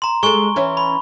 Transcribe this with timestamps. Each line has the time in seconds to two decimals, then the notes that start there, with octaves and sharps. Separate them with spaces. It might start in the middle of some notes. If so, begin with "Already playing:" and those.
0.02 A#5 C6
0.23 G#3 A4 G#5 C#6 G7
0.56 E3 C#4 E4
0.77 B5